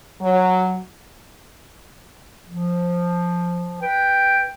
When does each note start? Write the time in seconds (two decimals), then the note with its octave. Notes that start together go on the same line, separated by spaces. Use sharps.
0.21 F#3
2.48 F3
3.81 B4 G5